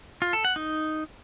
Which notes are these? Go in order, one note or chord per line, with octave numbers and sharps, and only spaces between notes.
F4
A4
F#5
D#4